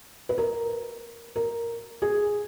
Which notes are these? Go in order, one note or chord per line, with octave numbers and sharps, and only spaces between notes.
B4
A#4
A#4
G#4